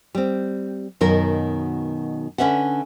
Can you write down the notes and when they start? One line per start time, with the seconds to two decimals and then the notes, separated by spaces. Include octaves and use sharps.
0.15 G3 C4
1.01 F#2 B2 D#3 B3 A#4
2.38 D3 C#4 B4 E5 F#5